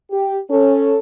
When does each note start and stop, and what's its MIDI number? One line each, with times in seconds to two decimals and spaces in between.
0.11 0.39 67
0.50 0.97 61
0.50 0.97 69